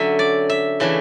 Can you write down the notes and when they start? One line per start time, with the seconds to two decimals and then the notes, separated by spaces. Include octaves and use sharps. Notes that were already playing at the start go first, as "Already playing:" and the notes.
Already playing: D3 F#3 C#4 E5
0.19 D5
0.50 E5
0.80 C#3 E3 A3 D4